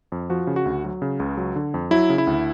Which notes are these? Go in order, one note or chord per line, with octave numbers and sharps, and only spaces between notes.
F2
F3 F#4
C#3
F#4
D2
F#3
C#3
C#2
F#3
D3
F2
F#3 E4
C#3
E4
D2